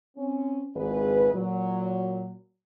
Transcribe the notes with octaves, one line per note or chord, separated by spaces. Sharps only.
C4 C#4
G#1 C#2 E4 G#4 B4
A#2 F#3